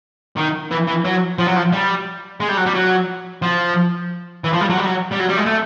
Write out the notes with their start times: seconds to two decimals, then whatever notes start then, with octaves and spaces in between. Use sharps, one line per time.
0.37 D#3
0.71 E3
0.87 E3
1.04 F#3
1.39 F3
1.48 F#3
1.56 F3
1.73 G3
2.40 G#3
2.49 G3
2.57 F#3
2.66 G3
2.74 F#3
3.42 F3
4.44 E3
4.53 F3
4.61 G3
4.70 F#3
4.78 G3
4.86 F#3
5.12 G3
5.20 F#3
5.29 G3
5.37 G#3
5.46 A3